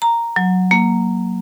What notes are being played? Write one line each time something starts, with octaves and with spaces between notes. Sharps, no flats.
A#5
F#3
A#3